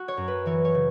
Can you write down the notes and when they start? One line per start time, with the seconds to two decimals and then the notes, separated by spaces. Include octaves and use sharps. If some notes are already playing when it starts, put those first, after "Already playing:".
Already playing: F#4
0.08 C#5
0.17 F#2
0.28 B4
0.46 E3 C#5
0.65 C#5
0.75 C#3